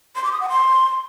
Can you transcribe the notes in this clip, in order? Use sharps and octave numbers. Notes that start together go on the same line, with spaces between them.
C6
D6
D#6
F#5
C6